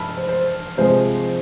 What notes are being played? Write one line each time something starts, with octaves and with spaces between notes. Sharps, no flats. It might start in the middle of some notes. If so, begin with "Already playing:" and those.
Already playing: A5 B5 E6 F6
C5
C5
C3 F3 G#3 C5